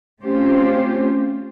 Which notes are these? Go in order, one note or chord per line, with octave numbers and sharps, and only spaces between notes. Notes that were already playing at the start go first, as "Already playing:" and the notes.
A3 C4 C#4 F4 G4 C5